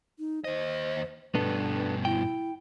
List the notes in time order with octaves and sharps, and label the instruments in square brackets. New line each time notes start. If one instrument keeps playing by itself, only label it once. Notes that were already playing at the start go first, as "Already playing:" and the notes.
[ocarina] D#4
[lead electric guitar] D#2 D#5 [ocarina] C5
[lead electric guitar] G2 B2 [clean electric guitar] B3 D4 A4 [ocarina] B4
[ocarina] E4 [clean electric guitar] G5